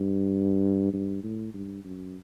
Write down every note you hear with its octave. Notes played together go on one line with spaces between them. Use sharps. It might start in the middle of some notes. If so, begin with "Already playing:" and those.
Already playing: G2
G2
A2
G2
F#2